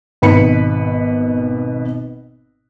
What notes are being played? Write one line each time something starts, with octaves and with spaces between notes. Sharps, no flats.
G#1 B2 B4 B5 C#7